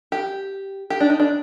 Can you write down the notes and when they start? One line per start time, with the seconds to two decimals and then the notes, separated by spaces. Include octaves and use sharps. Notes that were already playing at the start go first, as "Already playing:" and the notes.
0.12 G4
0.90 G4
1.00 D4
1.10 D#4
1.20 D4